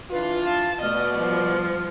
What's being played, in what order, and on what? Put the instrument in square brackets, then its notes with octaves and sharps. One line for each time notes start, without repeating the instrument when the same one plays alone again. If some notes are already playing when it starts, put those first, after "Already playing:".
[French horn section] E3 D4 F4 [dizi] B4
[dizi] F5 [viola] A5
[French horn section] B2 D5 [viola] A3 D#5 [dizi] F6
[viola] F3 G3